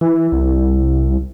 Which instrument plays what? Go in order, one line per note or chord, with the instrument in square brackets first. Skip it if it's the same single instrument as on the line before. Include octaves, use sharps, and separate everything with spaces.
[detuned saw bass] E3 [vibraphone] E4
[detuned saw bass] C2